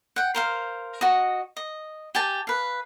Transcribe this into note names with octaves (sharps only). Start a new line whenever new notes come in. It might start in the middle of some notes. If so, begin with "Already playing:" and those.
F#5 G5
A#4 C5 F5
F#4 D#5
D#5
G4 G#5 A5
B4 F5